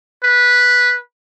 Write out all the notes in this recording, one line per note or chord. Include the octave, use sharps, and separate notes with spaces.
B4